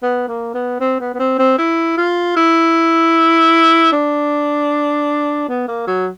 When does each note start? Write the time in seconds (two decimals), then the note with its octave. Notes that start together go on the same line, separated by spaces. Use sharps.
0.02 B3
0.28 A#3
0.54 B3
0.80 C4
1.00 B3
1.14 B3
1.19 C4
1.39 C4
1.58 E4
1.97 F4
2.36 E4
3.92 D4
5.48 B3
5.68 A#3
5.87 F#3